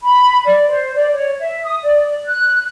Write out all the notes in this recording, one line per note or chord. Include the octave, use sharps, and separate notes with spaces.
B5
D5
C5
D5
C#5
E5
D#6
D5
F#6